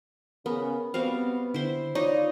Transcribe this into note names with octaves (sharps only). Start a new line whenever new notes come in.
C#3 B3 A#4
G3 B3 C4 F#4 F5
D3 E4 C5
D#4 F4 C#5 D5